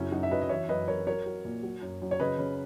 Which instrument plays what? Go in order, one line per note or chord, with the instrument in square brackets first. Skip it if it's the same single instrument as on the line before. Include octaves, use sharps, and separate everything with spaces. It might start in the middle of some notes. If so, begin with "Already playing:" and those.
Already playing: [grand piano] F#2 C#3 C#4 E4
F#2 D#4 F#4
E5
F#3 B4 D#5
D#5
E3 C#5 E5
F#2 B4 D#5
F#2 A#4 C#5
F#3 A#4 C#5
F#3
A#2
F#3
F#2
F#2
C#5
C#3 B4 D#5
C#3